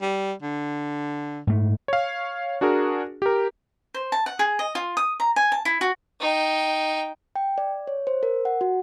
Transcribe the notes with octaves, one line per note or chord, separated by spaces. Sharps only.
G3
D3
G#2 A3
C#5 F5
D4 F#4 G#4 A#4
G4 A#4
C5
A5
F#5
G#4
D#5
F4
D#6
A#5
G#5
A5
E4
F#4
D#4 G5
G5
D5
C#5
C5
A#4
F#5
F#4